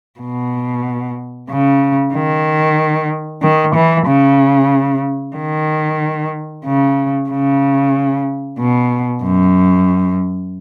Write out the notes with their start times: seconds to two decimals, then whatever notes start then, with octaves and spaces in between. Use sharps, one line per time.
0.20 B2
1.50 C#3
2.14 D#3
3.42 D#3
3.75 E3
4.07 C#3
5.37 D#3
6.65 C#3
7.30 C#3
8.59 B2
9.24 F#2